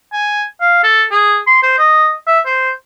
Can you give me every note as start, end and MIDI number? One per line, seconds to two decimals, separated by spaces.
0.13 0.42 80
0.61 0.80 77
0.83 1.04 69
1.11 1.38 68
1.47 1.59 84
1.63 1.74 72
1.78 2.13 75
2.27 2.40 76
2.46 2.70 72